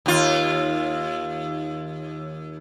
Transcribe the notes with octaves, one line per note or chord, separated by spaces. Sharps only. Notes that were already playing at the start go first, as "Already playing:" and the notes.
D#2 F4